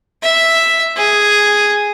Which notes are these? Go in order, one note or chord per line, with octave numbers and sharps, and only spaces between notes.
E5
G#4